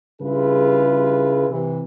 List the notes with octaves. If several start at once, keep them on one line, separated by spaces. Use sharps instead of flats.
G2 C#3 E4 F4 G#4 B4
C3 E3